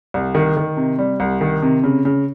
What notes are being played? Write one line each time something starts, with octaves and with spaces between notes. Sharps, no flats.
C2
D#3
D#3
C3
G3
C2
D#3
C3
C#3
C#3